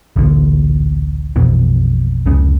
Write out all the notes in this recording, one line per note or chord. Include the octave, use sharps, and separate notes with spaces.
A1 D2 A#2 D3
A#1 F2 B2 E3
F1 C#2 C#3